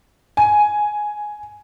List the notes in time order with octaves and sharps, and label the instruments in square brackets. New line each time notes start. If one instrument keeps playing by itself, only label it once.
[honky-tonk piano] G#5